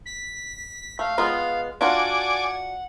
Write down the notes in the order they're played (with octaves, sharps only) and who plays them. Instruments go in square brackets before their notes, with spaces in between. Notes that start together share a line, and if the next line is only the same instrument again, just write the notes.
[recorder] B6
[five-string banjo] A3 [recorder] F5
[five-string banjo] G#3 B3 F4
[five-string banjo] D4 F4 F#4 [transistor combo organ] D5 G#5 D6 [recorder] F#5